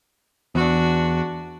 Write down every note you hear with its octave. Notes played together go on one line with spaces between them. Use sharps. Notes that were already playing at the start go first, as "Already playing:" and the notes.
E2 D4 F#4